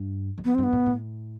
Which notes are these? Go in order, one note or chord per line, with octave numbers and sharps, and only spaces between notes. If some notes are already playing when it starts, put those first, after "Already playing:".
Already playing: G2
E2
F2 B3
G2 C4
B3
A2
A2